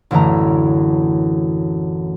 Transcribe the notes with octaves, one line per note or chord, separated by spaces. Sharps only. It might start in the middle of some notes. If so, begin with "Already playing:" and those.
A1 F#2 D3 E3 A3 A#5